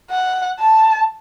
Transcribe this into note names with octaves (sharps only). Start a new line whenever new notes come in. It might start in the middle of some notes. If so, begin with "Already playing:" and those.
F#5
A5